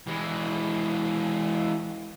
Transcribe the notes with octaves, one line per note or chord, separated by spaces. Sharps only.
E3 G#3